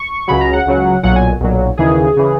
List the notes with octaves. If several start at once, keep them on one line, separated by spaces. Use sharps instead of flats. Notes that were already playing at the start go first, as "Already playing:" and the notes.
Already playing: C#6
C#2 C#3 F#3 B5
A#5
F#5
C#2 C#3 F#3
B1 A#2 F#3 F#5
G#5
B1 A#2 F#3
D#2 C#3 E3 G#4
C#3 E3